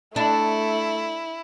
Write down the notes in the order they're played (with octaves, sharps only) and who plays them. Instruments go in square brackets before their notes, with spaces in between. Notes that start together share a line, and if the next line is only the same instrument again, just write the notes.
[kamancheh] A3 [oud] D4 [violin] E4